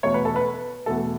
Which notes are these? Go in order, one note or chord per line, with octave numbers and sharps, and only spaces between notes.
E2 B2 A3 C#5
B4
A4
B4
E2 B2 A3 A4